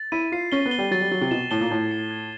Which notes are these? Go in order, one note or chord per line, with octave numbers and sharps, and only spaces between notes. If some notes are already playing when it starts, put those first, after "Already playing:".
Already playing: A6
E4 D#7
F4 C7
C#4 G7
B3
G7
G3
F#3 A6
G3
F#3 A6
C3
B2 E7
A2 G7
A#2
A2 G#6
C7
G#6